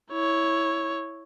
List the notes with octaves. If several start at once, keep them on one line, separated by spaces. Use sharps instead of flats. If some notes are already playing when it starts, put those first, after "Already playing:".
E4 C#5